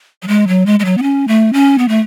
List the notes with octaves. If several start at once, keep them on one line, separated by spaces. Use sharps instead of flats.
F#3
G#3
F#3
G#3
G#3
F#3
B3
C#4
A3
C#4
B3
A3